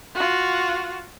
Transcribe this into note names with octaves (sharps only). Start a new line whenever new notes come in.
F4 F#4